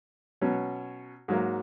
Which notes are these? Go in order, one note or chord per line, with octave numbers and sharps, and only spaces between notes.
B2 F#3 C#4
G#2 F#3 A#3